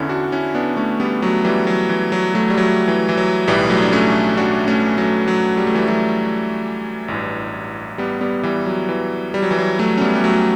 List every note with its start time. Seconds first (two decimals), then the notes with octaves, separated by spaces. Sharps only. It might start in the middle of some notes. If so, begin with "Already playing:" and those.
Already playing: E2 D3 C#4 E4
0.09 D4 F#4
0.32 C#4 E4
0.55 B3 D4
0.76 A3 C#4
1.00 G3 B3
1.22 F#3 A3
1.44 E3 G3
1.67 F#3
1.89 E3
2.12 F#3
2.34 F#3 A3
2.50 G3
2.58 F#3
2.88 E3
3.09 E3
3.17 F#3
3.47 B1 A2 E3 G3
3.70 F#3 A3
3.83 D4
3.92 A3 C#4
4.37 D4 F#4
4.68 A3 C#4
4.98 F#3 A3
5.28 F#3
5.57 G3
5.67 A3
5.75 E3 G3
5.88 F#3 A3
7.08 A1 G2 E3
7.98 G3 B3
8.21 G3 B3
8.43 E3 G3
8.66 F#3
8.89 E3
9.34 G3
9.42 F#3
9.51 E3
9.59 F#3
9.79 F#3 A3
9.97 C#4
10.01 G3 B3
10.15 G3
10.24 F#3 A3